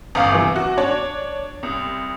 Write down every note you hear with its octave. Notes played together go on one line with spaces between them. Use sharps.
G1 E2 F5 D6
C3 E3
F#4
D4 C#5
C2